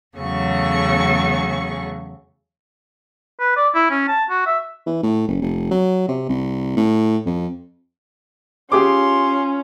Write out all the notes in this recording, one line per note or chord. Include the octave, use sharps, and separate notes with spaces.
E2 C#3 F#3 A3 G#4 C#6
B4
D5
E4
C#4
A5
F#4
E5
E3
A2
F#1
F1
F#3
C3
C2
A2
F2
C#4 F4 G4 G#4 C6 D6